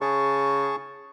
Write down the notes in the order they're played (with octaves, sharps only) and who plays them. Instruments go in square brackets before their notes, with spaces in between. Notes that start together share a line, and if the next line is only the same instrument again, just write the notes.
[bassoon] C#3 [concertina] G#4 A5 C#6